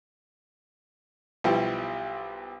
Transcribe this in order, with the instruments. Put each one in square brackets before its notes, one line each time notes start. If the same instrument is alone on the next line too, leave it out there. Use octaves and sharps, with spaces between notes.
[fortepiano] B1 B2 F3 G3 E4 G4